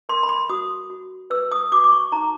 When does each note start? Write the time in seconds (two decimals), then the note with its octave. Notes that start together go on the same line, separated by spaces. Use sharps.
0.09 A#4 C6
0.23 B5
0.29 C6
0.49 F#4 D#6
0.90 F#4
1.30 B4 E6
1.52 D#6
1.72 F#4 D6
1.84 D6
1.92 C#6
2.12 D#4 A#5